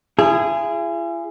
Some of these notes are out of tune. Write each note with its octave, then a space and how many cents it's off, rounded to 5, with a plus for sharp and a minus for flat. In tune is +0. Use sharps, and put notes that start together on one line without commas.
E4 +45 G#4 -5